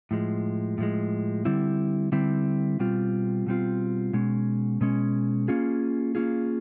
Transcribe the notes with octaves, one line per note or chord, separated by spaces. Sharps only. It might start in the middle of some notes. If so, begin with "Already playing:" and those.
A2 F3 G#3
A2 F3 G#3
D3 G3 C4 E4
D3 G3 C4 E4
B2 G3 C4 F4
B2 G3 C4 F4
B2 G#3 C#4
B2 G#3 C#4
A#3 C#4 F4 G#4
A#3 C#4 F4 G#4